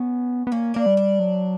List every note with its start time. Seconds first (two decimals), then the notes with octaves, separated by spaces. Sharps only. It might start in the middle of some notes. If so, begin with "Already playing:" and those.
Already playing: B3 C#4
0.47 B3
0.52 A#3 C#4
0.74 A#3 D4
0.86 G3
0.97 D4
1.20 F#3